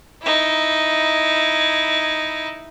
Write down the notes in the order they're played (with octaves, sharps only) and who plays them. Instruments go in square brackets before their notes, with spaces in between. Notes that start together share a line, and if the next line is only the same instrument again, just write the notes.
[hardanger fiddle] D#4 E4